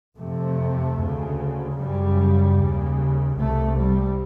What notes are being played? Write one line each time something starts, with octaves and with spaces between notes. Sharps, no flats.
F2 C3 A3
D2 C#3
F#2 C#3 G3
D#2 C#3
C2 C3 A3
G3